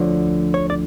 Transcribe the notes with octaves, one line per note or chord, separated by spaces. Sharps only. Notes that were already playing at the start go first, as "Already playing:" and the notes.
Already playing: D2 D3 F3 C#5
C#5
D5